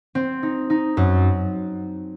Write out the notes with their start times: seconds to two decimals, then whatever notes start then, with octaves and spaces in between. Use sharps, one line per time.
0.15 C4
0.43 D#4
0.70 D#4
0.97 F#2